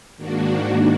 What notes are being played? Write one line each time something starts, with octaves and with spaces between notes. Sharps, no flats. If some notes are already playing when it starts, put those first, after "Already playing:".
G#2 D#3 A#3 D4 F#4